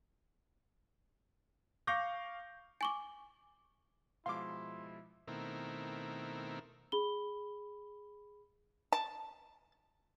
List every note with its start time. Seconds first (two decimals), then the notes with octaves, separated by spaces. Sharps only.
1.87 F5 C#6 D6 G6 A#6
2.81 G#5 C#6 D6
4.26 B2 F3 G#3 E4 F5 C6 D6
5.28 B2 D#3 A3 C4 E4 A#4
6.92 G#4 B5 G7
8.92 A5